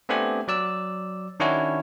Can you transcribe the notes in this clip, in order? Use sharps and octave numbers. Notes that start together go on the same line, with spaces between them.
A3 B3 C4 D4 G4 G#5
F#3 D5 E6
D#3 C#4 D4 E4 F#4 C#5